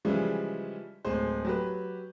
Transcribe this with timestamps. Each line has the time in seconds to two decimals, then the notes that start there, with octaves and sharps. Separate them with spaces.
0.05 C#3 E3 F3 G3 G#3
1.04 D1 G#3 C5
1.45 F#3 G4 B4